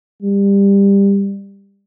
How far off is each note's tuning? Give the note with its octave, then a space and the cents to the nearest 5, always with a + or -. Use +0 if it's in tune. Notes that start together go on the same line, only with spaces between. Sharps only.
G3 +20